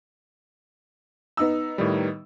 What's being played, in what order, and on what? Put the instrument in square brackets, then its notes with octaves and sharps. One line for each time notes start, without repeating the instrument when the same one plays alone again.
[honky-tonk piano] B3 D#4 E6
[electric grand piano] A2 D#3 G3